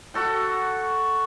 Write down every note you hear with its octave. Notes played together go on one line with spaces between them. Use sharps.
F#4 A4 G5